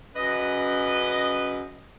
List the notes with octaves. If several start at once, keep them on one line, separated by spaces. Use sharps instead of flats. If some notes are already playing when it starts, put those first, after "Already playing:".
F#2 C#3 B4 D#5